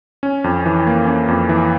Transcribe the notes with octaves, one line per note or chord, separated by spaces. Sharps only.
C#4
F2
E3
A#3
C#4
F2
E3